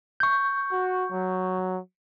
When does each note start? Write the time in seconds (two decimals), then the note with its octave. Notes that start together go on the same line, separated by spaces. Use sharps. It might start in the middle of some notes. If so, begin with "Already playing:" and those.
0.20 C#6 G6
0.72 F#4
1.12 F#3